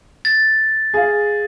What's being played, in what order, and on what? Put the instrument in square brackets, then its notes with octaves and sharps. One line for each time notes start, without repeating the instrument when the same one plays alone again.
[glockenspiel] A6
[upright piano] G#4 F5